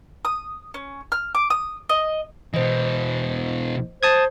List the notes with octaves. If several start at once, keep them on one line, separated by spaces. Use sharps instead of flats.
D#6
C#4
F6
D6
D#6
D#5
B2 E3 C5 D#5
C5 A5 D#6 G#6